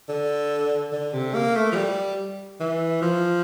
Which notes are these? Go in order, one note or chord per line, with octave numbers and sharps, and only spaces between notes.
D3
D3
C3
A#3
A3
F3
G3
E3
F3